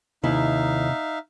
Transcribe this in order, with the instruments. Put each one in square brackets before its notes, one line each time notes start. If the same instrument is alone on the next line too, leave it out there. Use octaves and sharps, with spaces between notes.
[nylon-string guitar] D#2 E4 [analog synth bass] C3 [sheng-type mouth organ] D#4 E5 F5